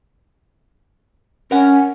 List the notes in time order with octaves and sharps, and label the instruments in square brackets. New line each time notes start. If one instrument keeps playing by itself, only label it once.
[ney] C#4 [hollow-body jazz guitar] A#4 F#5